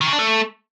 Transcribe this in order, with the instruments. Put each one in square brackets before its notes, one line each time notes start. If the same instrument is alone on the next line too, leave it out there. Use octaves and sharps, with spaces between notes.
[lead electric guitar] D#3
C#3
D4
A3